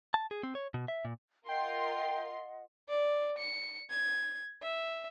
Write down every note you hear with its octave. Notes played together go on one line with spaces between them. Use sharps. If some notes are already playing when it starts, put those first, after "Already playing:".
A5
G#4
C4
C#5
B2
E5
A#2
F4 A#4 D#5 F#5 G5 C6
D5
C#7
G#6
E5